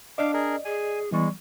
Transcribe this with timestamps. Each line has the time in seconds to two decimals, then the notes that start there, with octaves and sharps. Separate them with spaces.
0.18 D4 D5 D#5 F5 D6
0.34 G#4 A#4
0.65 G#4 G#5
1.12 E3 G3 G#3 B3 C#6